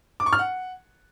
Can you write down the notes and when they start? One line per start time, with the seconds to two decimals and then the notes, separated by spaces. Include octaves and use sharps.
0.20 D6
0.26 C#6
0.33 F6
0.39 F#5